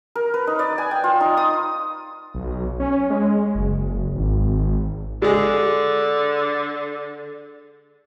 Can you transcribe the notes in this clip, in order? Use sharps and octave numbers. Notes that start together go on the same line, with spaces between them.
A#4
B4
D#4
D5
G#5
G5
F4
D#4
D#6
B1
C#4
G#3
F#1
G#1
D3 G#3 G#4